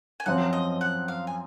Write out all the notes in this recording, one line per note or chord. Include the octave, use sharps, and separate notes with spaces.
G#5
F#2 F3 C4 F#5
D#5
F#5
F5
G#5